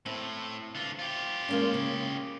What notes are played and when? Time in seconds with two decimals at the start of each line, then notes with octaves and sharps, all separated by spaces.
0.06 A2 C4
0.75 D3 F4
0.99 F4 G4
1.49 G#3 A#3 C#4
1.74 C#3